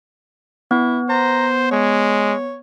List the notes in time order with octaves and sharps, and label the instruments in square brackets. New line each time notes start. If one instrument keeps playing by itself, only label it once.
[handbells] B3 [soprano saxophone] E4
[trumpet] C5 [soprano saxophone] A#5
[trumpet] G#3 [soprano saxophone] C#5